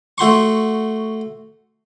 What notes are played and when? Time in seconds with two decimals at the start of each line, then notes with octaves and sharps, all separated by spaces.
0.18 A3 F#4 C6 C#6